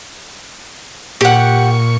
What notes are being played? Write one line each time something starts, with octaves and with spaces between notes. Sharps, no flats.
A#2 G4 F#5 C#6